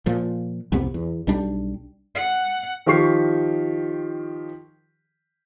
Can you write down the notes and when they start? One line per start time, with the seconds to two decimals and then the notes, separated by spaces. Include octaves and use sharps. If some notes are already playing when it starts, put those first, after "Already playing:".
0.06 A#2 F3
0.72 C2 F2 C3 B3
0.94 E2
1.27 B1 G3 D4
2.15 F#5
2.86 D#3 F3 G4 C#6 C7